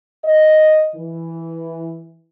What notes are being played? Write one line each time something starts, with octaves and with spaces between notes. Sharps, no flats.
D#5
E3